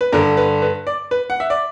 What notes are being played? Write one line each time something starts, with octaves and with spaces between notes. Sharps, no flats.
B4
G2 D3 A#4
B4
B4
D5
B4
F#5
E5
D5